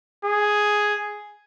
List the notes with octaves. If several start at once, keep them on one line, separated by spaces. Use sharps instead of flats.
G#4